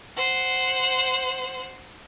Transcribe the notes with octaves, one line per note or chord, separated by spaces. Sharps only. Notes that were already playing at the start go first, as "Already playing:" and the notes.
C5 F#5